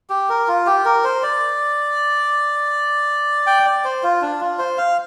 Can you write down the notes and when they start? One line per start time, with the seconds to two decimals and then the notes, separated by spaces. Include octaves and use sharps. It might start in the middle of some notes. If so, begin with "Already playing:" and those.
0.10 G4
0.29 A#4
0.48 F4
0.66 G4
0.85 A#4
1.04 C5
1.23 D5
3.47 G5
3.66 D5
3.84 C5
4.03 F4
4.22 D4
4.40 F4
4.59 C5
4.78 F5